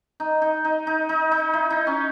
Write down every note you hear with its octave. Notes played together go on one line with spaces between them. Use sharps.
D#4
D#4
D#4
D#4
D#4
D#4
E4
D#4
C#4